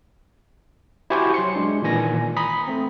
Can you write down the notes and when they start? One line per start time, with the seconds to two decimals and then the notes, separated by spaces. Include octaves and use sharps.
1.10 E4 F#4 G4 C5 G#5 C#6
1.34 F#3 C6 C#7
1.55 G#3 D4
1.82 A#2 D#3 E3 G#5 A#6
2.37 A#5 B5 D#6 B6
2.68 A3 C4